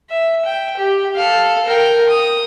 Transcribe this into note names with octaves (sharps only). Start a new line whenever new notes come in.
E5
G5
G4
A4 F5
A#4 G5
D#6